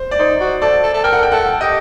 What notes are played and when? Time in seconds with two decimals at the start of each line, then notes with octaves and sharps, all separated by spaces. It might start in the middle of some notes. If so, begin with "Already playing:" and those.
Already playing: C5
0.11 D5
0.19 D#4 C5
0.40 F#4
0.62 A4 D5
0.83 A4
0.94 A4
1.04 A#4 G5
1.13 F#5
1.23 G5
1.32 A4 F#5
1.61 G4 D#5